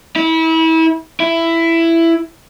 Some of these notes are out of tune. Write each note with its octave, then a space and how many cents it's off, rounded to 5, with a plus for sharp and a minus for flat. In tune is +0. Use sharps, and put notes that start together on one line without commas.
E4 -30
E4 +10